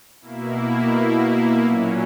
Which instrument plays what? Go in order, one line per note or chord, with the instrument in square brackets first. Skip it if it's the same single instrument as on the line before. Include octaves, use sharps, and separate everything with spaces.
[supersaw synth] B2 A#3 E4
A#2 F#3 C#4